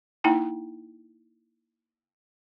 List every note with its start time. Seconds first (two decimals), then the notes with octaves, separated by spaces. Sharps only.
0.24 A#3 D#4 E4 G5 A5